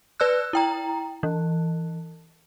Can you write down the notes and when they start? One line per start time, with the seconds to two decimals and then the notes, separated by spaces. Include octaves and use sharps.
0.20 B4 D5 E6 F#6
0.53 E4 G5 A#5
1.23 E3